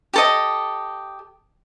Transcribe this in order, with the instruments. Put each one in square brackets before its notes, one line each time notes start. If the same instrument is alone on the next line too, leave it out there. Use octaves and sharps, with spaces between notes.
[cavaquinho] G4 A4 D#5